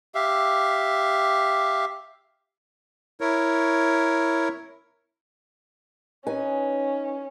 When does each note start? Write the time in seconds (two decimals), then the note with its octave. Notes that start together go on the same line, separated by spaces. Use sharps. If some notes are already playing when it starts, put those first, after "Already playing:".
0.15 G4 E5 F5
3.21 E4 A#4 C#5
6.27 C#4 D#4 B4 G#5